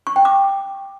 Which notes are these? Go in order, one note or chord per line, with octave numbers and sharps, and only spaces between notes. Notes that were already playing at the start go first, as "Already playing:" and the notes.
C#6
G5
D6